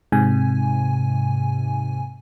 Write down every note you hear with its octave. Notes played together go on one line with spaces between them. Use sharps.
G#2 C3 G#5